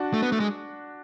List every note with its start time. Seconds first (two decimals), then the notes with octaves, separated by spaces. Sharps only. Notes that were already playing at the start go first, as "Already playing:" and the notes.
Already playing: D4 F#4
0.14 A3
0.22 B3
0.32 A3
0.40 G#3